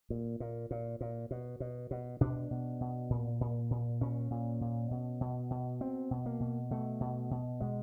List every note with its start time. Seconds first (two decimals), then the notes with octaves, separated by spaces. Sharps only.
0.10 A#2
0.40 A#2
0.71 A#2
1.01 A#2
1.31 B2
1.60 B2
1.91 B2
2.21 B2 D4
2.51 B2
2.81 B2
3.10 A#2
3.41 A#2
3.71 A#2
4.01 A#2 C#4
4.31 A#2
4.61 A#2
4.91 B2
5.21 B2
5.51 B2
5.80 B2 C4
6.11 B2
6.26 A#3
6.40 B2
6.71 B2 A3
7.01 B2
7.31 B2
7.60 B2 G#3